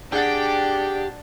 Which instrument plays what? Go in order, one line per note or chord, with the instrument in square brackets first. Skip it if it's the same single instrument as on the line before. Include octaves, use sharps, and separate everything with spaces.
[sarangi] D4 [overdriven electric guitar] G4 [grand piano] G#4 F#5 A6